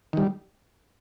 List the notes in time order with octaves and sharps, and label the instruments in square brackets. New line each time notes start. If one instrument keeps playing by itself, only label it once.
[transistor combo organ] D#3 G3